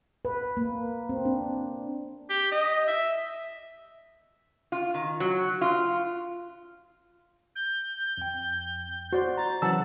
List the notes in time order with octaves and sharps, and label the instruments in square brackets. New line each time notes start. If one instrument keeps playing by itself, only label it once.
[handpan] B4
A#3
C4
D4
[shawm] G4
D#5
E5
[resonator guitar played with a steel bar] F4
D#3
F#3
F4
[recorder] G6
[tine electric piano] F2 G5
[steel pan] F#4 [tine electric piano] C5 D5 C6
[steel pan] A#5 [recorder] A6
[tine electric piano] C#3 E3 F#3 [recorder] F#5 [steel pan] A5 E6